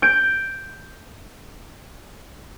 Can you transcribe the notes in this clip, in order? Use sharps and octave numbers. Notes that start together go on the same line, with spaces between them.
G6 D7